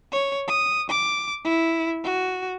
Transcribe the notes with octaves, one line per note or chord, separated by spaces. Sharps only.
C#5
D#6
D6
E4
F#4